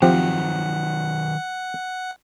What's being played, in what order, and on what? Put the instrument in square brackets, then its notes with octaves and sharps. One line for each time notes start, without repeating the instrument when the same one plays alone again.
[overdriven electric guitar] D#3 F#3 [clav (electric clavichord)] F3 C4 G4 [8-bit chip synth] F#5